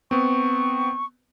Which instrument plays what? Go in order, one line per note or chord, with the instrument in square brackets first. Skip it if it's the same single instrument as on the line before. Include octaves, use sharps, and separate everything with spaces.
[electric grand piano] B3 C4 [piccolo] C#6